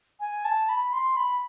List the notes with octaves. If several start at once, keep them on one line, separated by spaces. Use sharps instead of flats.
G#5
A5
B5
C6
B5